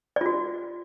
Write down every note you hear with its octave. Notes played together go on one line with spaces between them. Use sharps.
F4 F#4 D5